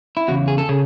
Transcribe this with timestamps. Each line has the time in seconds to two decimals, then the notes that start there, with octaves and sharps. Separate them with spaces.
0.17 E4
0.28 E2 C#3 F#4
0.48 G#4
0.58 A4
0.69 C#3 G#4